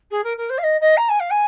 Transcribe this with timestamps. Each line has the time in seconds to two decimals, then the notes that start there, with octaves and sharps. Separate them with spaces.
0.11 G#4
0.24 A#4
0.37 A#4
0.49 C5
0.58 F5
0.63 D#5
0.81 D#5
0.97 A#5
1.09 G#5
1.20 F5
1.31 G#5